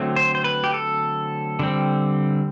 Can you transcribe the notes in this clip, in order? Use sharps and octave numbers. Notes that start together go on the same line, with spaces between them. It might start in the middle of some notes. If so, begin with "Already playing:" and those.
Already playing: D3 F#3 A3 C4
C5
C5
B4
G4
A4
D3 G3 C4